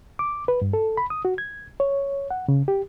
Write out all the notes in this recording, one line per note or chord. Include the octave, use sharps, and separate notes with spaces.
D6
B4
G2
A4
B5
D#6
F#4
G#6
C#5
F#5
C#3
G4